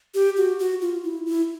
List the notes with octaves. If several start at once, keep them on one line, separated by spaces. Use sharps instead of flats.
G4
F#4
F#4
F4
E4
E4